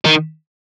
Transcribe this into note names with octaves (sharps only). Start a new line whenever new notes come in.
D#3